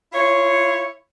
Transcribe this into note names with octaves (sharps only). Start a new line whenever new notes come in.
E4 F4 C#5